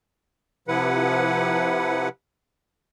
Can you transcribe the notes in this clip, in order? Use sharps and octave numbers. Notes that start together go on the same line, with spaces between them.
C3 F3 E4 B4 F#5